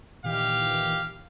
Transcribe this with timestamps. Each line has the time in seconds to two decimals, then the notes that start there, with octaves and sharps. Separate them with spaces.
0.24 A#2 D#3 E3 G4 F5